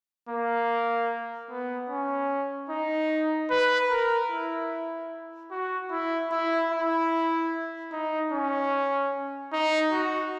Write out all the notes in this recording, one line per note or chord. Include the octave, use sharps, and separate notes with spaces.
A#3
B3
C#4
D#4
B4
A#4
E4
F#4
E4
E4
E4
D#4
C#4
D#4
F#4